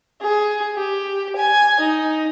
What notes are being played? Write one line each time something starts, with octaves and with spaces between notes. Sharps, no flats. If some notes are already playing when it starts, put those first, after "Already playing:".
G#4
G4
G#5
D#4